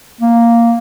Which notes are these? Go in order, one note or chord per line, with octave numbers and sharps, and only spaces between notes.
A#3